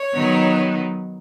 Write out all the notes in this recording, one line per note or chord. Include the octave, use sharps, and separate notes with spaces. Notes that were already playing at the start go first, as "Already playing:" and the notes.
Already playing: C#5
D#3 F#3 B3 D#4